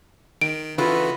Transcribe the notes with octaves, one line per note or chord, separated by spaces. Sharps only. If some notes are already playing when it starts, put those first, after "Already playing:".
D#3 D7
C#3 E3 F4 F#4 A4 B4 B5